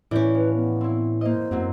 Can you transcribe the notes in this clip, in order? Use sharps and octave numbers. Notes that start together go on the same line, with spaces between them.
A2 E3 C#4 D5 G6
F3 B4
B3
C4 E4
A#3 C5 D#5
F#2 F#3 A#3 C4